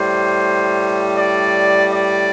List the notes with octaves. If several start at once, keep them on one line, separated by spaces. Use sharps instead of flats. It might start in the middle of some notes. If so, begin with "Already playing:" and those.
Already playing: A2 G3 C5
D5
D5